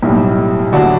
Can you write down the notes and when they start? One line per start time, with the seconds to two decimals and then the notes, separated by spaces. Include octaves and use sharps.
0.03 B1 A2 G3
0.73 D2 D3 F#3 D4 F#4